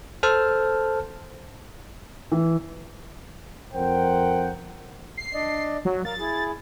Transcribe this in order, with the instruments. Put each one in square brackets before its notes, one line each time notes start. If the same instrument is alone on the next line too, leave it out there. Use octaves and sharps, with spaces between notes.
[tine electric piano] A4 C5 A5 F6
[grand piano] E3
[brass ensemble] F2 A#4 C5 F#5 G5
[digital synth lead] C7
[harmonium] D4 D5 D#5
[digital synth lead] F#3
[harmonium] A#4 F5 [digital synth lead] A6
[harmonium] E4 G#4